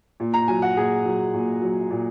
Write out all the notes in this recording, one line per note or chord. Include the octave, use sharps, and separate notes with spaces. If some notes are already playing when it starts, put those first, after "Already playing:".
A#2
A#5
F#3 G#5
F#5
A#2 G#4
F#3
A#2
F#3
A#2